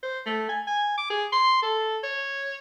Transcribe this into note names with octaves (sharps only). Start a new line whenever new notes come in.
C5
A3
G#5
G#5
D6
G#4
C6
A4
C#5